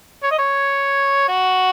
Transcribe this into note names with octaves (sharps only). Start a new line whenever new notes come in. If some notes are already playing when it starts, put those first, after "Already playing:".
C#5
D#5
C#5
F#4